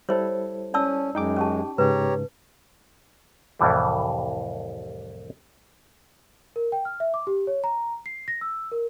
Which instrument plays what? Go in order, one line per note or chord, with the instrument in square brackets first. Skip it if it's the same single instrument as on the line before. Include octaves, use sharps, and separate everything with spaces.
[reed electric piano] G3 E4 A4 [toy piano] C5 C#5
[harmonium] C#4 [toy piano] D5 A5 E6
[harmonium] F#2 G#3 [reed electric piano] D#4 G5 D6
[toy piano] C#4 G4 A5
[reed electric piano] G#2 C#3 [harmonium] G4 C#5 A#5 [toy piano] B4
[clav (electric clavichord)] C2 F2 A2 E3 G3
[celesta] A#4
G5
F6
E5
D6
G4
C#5
A#5
C7
A#6
E6
A#4